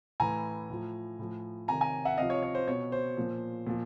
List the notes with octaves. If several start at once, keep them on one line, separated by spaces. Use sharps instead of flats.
A2 E3 G#5 A#5
A2 F3
A2 F3
C3 D#3 G#5 A#5
G#5 A#5
E5 F#5
C3 F3 D#5 F5
C#5
C#5
C5
B2 C#5
C5
A#2 F3
A#2 F3